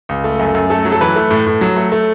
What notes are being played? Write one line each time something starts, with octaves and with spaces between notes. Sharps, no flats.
C#2
A3
F#2
F#2
A3 A4
F#3
A4
E3 B4
A3
A2
A2
F#3
A3
A3